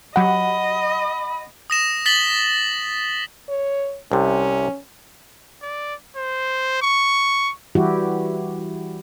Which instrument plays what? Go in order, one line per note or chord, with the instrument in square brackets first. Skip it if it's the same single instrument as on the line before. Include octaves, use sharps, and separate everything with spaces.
[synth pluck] F#3 G4 [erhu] D#5 [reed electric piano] F#5 [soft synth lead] B5
[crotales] D#6 A#6 E7
A6 B6 F#7 G7
[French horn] C#5
[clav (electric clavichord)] C2 C3 [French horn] C#4
[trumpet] D5
C5
C#6
[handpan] E3 G3 E4 F#4 G4